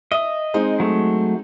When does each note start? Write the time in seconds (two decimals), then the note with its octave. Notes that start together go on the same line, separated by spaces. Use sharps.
0.12 D#5 E5
0.54 G#3 C4 D#4
0.80 F#3 A3